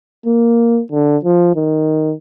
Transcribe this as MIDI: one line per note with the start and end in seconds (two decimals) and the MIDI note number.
0.26 0.81 58
0.91 1.17 50
1.24 1.53 53
1.56 2.14 51